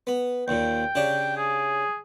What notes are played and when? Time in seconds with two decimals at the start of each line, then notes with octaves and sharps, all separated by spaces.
0.07 B3
0.48 D#2 A#2 G5
0.95 C#3 D4 G4
1.37 G#4